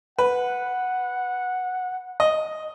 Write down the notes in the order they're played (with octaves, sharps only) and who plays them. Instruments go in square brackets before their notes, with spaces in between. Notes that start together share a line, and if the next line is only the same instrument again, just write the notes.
[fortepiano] B4 [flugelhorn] F#5
[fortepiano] D#5